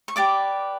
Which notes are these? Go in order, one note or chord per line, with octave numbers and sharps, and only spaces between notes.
C#6
G4 B4 D5 D6